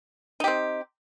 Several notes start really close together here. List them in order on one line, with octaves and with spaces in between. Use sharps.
D#4 G4 C4